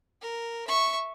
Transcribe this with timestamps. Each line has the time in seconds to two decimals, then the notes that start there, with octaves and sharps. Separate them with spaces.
0.22 A#4
0.67 E5 C#6